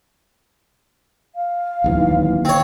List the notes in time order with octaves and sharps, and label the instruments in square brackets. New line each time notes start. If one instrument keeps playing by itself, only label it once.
[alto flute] F5
[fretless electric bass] D1 D#2 E3
[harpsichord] C4 C#5 [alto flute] D#5